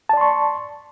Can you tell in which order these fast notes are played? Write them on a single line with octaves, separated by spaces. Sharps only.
A5 D5 C6 C#6